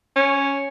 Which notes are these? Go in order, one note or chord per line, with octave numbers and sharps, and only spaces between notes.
C#4